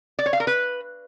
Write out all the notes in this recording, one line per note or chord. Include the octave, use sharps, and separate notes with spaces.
D5
C#5
F5
A#4
B4